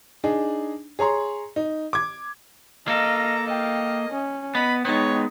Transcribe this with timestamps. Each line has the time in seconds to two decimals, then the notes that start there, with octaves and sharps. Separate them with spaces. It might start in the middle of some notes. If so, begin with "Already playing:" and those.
0.24 D4 D#4 G#4
0.99 G#4 C#5 A#5 C6
1.56 D#4
1.93 D6 G#6
2.88 A#3 A4 D#5 F5 A#5
3.47 D#5 F5 G5
4.11 C#4
4.55 B3 D#5 B5
4.85 G#3 B3 D#4 C#5 G5